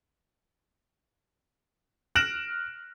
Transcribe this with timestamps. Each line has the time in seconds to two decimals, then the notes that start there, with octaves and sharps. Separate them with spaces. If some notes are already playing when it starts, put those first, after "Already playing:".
2.15 F6 F#6 A#6 D7 E7 F#7